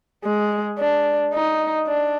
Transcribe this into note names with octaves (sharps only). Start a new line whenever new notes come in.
G#3
D4
D#4
D4